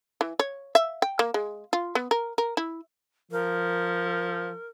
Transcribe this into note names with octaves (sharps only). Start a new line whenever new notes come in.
E3
C#5
E5
G5
A#3
G#3
F4
B3
A#4
A#4
E4
F3 A#4